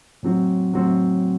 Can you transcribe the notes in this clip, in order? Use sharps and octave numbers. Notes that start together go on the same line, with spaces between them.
A2 F#3 C4 F#4
A2 F#3 C4 F#4